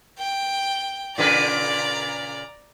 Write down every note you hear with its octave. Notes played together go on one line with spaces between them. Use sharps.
G5
A#2 C#3 B4 D5 A#5